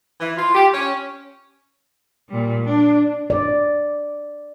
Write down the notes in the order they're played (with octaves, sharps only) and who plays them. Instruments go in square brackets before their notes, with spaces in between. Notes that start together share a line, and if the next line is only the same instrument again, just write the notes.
[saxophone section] E3
F4
G4
C#4
[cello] A#2 G3
D4
[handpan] D5